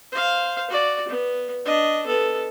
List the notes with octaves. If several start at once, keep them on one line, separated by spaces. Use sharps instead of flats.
C5 F5
F#4 D5
B3
D4 D#5
B3 A4